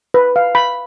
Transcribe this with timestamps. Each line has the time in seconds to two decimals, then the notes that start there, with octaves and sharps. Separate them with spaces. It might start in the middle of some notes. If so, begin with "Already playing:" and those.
0.14 B4
0.36 F5
0.55 B5